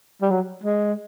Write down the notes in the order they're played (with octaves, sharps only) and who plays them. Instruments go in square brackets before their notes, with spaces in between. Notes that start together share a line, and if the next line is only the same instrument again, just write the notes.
[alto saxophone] G3
F#3
G#3